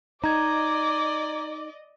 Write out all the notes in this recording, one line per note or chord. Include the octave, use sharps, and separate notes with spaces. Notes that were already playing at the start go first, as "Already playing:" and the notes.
D#4 D5 D#5 A#5 D6 G#6